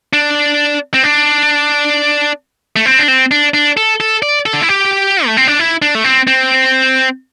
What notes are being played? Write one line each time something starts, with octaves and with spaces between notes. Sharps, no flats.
D4
C4
D4
A3
C4
D4
C4
D4
D4
A4
A4
D5
A4
D4
E4
G4
A3
C4
D4
E4
D4
A3
C4
C4